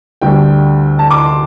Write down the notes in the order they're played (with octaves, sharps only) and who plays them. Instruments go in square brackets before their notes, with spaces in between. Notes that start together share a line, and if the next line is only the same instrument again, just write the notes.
[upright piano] D2 D3 G3 G5
A5
D6
C6